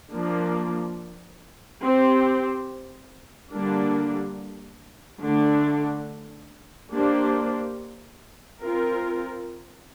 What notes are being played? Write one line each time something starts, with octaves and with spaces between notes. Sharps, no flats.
F3 A#3 D4
C4 G4 C5
D3 G3 A#3 D4
D3 A3 D4
A#3 D4 G4 C5
C4 F4 A#4